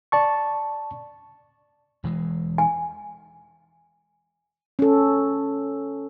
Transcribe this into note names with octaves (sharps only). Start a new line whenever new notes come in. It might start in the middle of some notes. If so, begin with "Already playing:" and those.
D5 A5 C#6
E1 E3 G#3
G#5
C#4 A4